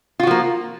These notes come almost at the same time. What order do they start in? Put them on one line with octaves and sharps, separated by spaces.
F4 F#4 F3 A#3